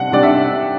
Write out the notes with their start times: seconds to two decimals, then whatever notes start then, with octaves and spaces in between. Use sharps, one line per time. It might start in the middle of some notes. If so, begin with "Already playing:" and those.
Already playing: C3 G3 D4 F#5
0.12 C3 G3 D4 D5
0.23 E5